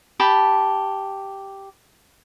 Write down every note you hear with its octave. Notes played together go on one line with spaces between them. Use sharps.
G4 A5 B5